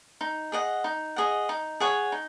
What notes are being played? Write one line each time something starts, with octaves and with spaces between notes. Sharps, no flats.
D#4
G#4 D#5 F#5
D#4
G#4 D#5 F#5
D#4
G#4 C#5 F#5
D#4